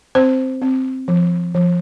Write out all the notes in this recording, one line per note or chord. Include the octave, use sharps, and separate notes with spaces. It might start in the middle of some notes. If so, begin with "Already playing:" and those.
C4 C5
C4
F3
F3